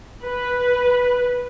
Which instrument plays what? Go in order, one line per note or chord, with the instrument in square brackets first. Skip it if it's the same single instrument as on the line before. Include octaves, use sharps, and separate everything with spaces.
[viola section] B4